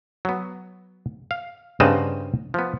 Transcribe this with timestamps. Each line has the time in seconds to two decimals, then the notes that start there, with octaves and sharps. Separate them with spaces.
0.25 F#3 B3
1.31 F5
1.80 G2 C#3 C4 D#5 F#5 A5
2.54 F3 B3